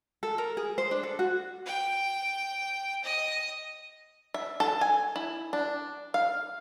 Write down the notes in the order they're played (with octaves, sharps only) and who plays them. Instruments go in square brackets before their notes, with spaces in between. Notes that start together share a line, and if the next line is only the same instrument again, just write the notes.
[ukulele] A4
A#4
G#4
C5
D4
A4
F#4
[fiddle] G5
D#5
[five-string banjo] E5
A4
G#5
E4
D4
F5